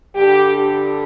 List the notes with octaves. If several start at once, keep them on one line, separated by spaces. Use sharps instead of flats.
G2 D3 G3 G4